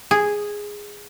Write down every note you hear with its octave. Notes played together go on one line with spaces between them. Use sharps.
G#4